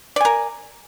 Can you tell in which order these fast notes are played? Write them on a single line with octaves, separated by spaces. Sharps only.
D5 G#5 A#4